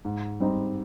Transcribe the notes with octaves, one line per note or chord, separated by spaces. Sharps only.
G#2
G3 C4 D#4